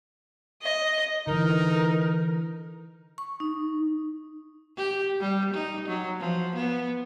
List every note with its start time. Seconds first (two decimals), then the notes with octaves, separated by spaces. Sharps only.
0.64 D#5
1.27 D3 E3 D#4 A#4
3.18 C#6
3.40 D#4
4.77 G4
5.21 G3
5.54 D#4
5.88 F#3
6.19 F3
6.56 B3